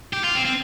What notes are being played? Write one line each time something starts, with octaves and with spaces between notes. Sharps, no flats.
G4
F4
C4
C4